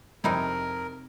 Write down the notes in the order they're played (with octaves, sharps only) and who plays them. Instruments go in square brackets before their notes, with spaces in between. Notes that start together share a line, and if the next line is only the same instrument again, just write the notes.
[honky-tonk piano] F2 [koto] C3 D#4 E4 [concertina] A#4